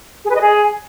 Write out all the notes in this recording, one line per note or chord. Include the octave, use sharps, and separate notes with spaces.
G#4
B4
D#5
G#4